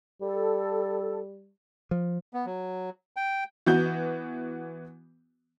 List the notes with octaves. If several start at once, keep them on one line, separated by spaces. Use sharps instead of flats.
G3 A4
F3
B3
F#3
G5
E3 B3 F#4 G6